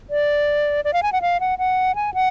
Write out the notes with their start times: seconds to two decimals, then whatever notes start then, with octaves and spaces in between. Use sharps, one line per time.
0.10 D5
0.85 D5
0.93 F5
1.03 G#5
1.13 F#5
1.22 F5
1.40 F#5
1.58 F#5
1.95 G#5
2.14 F#5